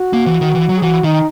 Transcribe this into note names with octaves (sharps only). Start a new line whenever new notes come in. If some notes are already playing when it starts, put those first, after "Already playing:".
Already playing: F#4
A#3
E3
D#3
E3
F#3
G#4
E3 F#4
D#3 D#4